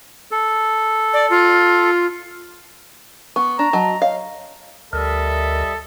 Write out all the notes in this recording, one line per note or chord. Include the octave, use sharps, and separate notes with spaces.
A4
D5
F4
B3 C#6
D4 A#5
F#3 D#5 A5
C#5 D#5 F5
D2 G3 A4 A#4 D#5 E5